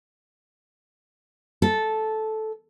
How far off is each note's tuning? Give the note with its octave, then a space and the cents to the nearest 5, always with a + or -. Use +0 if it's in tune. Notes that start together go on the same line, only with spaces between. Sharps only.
A4 -10